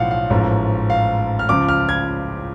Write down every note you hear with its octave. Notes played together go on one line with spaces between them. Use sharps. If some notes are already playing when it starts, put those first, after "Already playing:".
Already playing: B1 A2 F3 F5 F#5
F5
A1 G#2 F3
F5
F6
C#2 C#3 F3 D6
F6
G#6